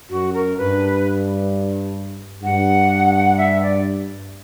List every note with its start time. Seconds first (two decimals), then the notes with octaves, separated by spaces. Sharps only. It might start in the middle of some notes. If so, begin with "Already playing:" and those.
0.10 F#2 F#4
0.33 A#4
0.57 G2 B4
2.43 G2 F#5
3.37 E5
3.61 D5